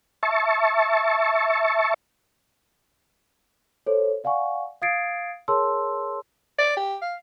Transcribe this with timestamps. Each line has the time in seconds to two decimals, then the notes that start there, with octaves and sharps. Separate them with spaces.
0.23 E5 A5 C#6
3.86 A4 C5 C#5
4.24 D5 F5 F#5 G#5 C#6
4.82 F5 D#6 G#6 A6 C7 D7
5.48 G#4 A#4 C#5 A5 C6 E6
6.58 D5
6.77 G4
7.02 F5